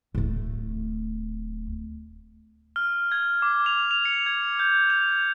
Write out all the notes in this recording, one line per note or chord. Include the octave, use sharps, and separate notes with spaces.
D1 A3
F6
G#6
D6
F7
F7
C#7
G#6
G6
F7